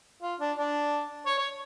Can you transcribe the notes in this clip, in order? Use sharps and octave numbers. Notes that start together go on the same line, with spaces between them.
F4
D4
D4
C#5
C#5